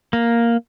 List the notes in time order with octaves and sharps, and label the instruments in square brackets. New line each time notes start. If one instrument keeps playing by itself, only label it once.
[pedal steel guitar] A#3